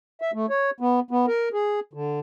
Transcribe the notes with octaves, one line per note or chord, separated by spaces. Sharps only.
E5
A3
C#5
B3
B3
A#4
G#4
D3